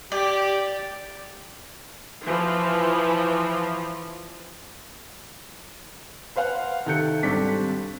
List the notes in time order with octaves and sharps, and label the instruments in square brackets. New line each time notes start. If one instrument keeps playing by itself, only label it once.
[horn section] G4 [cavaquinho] D5
[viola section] E3 F3
[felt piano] B4 C5 F5 F#5
C3 D#3 A4 F#6 G6 C#7
G#1 G3 C4 D4 A4 B6